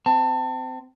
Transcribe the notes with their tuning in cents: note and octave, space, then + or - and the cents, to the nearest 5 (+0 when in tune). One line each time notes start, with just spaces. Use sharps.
C4 -25 A5 +20